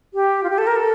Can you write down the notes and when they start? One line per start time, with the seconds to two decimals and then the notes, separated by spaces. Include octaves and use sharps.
0.14 G4
0.44 F4
0.50 G4
0.58 A4
0.67 A#4
0.76 A4